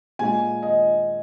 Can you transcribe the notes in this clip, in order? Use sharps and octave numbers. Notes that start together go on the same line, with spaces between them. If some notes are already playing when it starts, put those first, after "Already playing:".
A#2 G#3 G#5
D#5